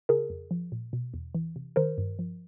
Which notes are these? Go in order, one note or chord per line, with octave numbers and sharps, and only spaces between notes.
C#3 G#4 A#4
F2
F3
A#2
B2
E2
E3
C3
D#3 A#4 C5
G2
F3